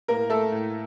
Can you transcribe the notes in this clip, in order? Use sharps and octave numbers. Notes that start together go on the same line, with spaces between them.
A2 A#3 A#4
A3 A4
A2